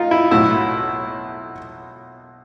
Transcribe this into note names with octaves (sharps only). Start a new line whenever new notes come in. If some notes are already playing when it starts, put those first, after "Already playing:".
Already playing: D#4 F4
E4
B1 A2 F#3 E4